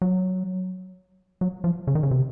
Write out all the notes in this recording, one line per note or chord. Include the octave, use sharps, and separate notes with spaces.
F#3
F#3
F3
C#3
D#3
C#3
C3